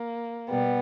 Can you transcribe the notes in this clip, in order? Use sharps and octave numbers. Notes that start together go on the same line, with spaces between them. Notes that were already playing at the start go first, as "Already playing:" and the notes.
Already playing: A#3
B2 G3 B3